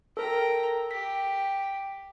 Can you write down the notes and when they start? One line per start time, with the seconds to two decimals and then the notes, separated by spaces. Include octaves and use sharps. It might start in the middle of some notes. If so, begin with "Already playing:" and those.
0.17 A4 A#4 G5 A#5
0.91 G4 B6